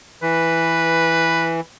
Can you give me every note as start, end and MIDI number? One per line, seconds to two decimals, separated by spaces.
0.22 1.61 52
0.22 1.65 71